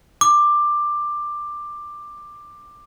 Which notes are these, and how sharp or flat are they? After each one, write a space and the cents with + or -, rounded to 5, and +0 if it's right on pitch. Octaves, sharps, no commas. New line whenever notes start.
D6 +15